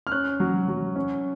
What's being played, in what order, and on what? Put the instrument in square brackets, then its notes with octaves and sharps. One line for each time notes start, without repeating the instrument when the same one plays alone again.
[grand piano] F6
C#4 F#6
F#3
F#3
C#4